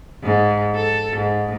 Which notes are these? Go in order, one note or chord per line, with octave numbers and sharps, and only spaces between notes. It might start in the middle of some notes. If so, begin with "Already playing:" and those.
G#2
A4
G#2